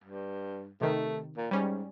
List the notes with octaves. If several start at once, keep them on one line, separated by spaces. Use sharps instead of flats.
G2
C3 D#3 A3
A#2
G#2 G3 C#4